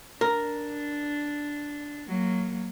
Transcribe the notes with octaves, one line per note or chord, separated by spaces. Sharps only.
D4 A#4
F#3 A#3